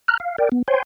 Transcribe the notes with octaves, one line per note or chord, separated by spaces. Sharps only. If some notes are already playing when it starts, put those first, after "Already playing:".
A#5 F6 F#6
F5
A#4 D5 G5
B3
C5 C#5 G5 G#5 C6